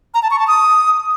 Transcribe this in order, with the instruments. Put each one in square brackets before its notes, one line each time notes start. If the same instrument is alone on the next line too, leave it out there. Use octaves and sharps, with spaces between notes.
[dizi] A#5
A5
C#6
A5
D#6